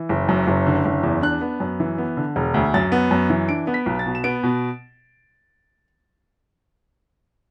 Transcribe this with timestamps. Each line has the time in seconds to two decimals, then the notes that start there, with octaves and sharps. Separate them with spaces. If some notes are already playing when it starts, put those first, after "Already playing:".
Already playing: E3
0.09 F#1
0.29 F#2
0.47 F#1
0.67 D3
0.85 F#1
1.03 E2
1.22 D4 F#6
1.41 B3
1.60 F#2
1.80 E3
1.98 B3
2.17 D3
2.36 E1
2.54 D2
2.74 F#2 A6
2.92 B3
3.11 F#2
3.30 E3
3.49 D4 D7
3.67 B3
3.74 B6
3.86 B1
3.99 A6
4.06 B2
4.15 E7
4.24 B3 D7
4.43 B2